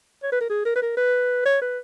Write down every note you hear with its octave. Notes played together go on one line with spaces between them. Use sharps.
C#5
B4
A#4
G#4
A#4
B4
A#4
B4
C#5
B4